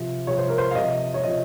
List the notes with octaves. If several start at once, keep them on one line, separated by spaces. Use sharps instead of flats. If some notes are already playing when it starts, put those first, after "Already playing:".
Already playing: C3 F3
C3 F3 C#5
C5
A#4
C5
F5
C3 F3 D#5
C#5
C3 F3 D#5